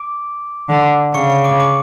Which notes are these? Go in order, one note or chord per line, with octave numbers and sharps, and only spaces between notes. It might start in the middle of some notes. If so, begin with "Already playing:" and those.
Already playing: D6 D7
D3
C#3 C#6 C#7
C#6 C#7
D6 D7
D6 D7